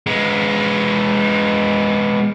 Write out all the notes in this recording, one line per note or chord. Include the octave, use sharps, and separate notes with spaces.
G#3 B3